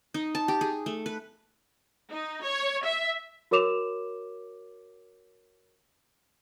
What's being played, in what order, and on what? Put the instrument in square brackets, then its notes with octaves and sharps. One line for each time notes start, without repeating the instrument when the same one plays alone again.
[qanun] D#4
A5
G4
G#4
A3
B4
[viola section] D#4
C#5
E5
[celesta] F#4 A#4 C#5 D6 E7 F7